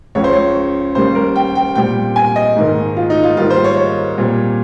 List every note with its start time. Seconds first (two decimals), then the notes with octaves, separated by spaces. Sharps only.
0.15 C#2 C#3 F3 C#5
0.24 C5
0.33 C#5
0.95 D#2 C#3 G3 A#3 C5
1.15 A#4
1.36 G5
1.56 G5
1.76 A#2 G3 C4 G5
2.16 G#5
2.36 D#5
2.56 G#2 D#3 A#3
2.97 F4
3.10 D#4
3.24 F4
3.37 G#2 D#3 G3 A#3 F4
3.50 C5
3.64 C#5
3.77 C#5
4.18 A#2 G3 C4